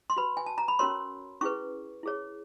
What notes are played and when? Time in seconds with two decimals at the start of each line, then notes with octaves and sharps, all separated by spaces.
0.10 C6
0.16 F#4 B4 B5
0.37 G#5
0.46 A5
0.58 A#5
0.68 B5
0.79 C#4 F#4 A#4 C#5 C6
1.41 C#4 E4 G#4 B4 C#6
2.03 E4 G#4 C#5